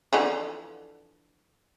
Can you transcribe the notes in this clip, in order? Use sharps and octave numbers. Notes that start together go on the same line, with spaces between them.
D3 E3 F3